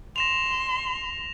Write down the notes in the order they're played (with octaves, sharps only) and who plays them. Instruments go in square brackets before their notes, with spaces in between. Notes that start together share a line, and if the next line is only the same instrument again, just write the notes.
[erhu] C6 [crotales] A#6 E7 F7